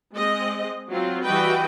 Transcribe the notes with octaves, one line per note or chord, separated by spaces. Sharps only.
G#3 C4 D#5
F#3 C4 F4
E3 G3 F#4 B4 D#5 G5